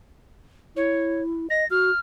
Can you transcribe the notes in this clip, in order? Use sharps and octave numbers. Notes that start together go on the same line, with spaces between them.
E4 C#5
D#5 A#6
F#4 F6